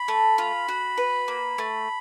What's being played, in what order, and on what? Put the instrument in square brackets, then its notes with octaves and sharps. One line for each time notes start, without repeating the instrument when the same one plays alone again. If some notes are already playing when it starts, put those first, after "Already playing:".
Already playing: [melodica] B5
[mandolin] A3
F4
F#4
B4
A#3
A3